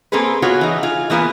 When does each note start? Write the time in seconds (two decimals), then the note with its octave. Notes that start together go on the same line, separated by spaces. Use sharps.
0.12 A#3 C4 G#4 A4 B4
0.42 B3 F4 F#4 G#4 C#5
0.61 E3 D#4
0.83 F4 G#4
1.10 E3 A#3 B3 F4 G#5